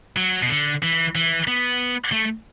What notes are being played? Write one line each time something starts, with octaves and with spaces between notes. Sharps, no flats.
F#3
B2
D3
E3
E3
B3
A3